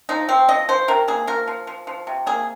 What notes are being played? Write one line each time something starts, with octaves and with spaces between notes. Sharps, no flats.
F3 D#4
F3 C4
F3 D#5
F3 C5
C3 A#4
A#3 G#4
F3 A#4
F3
F3
F3
C3
A#3 G#4